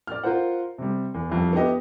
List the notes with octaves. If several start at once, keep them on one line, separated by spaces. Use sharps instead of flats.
D5 F6
F4 A#4 C5 F#5
C3 G3
E2
C2 F2
B3 D4 E4 G4 D#5